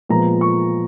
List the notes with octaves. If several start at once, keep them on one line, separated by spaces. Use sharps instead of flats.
A#2 F3 G#3 B3 A#5
C#6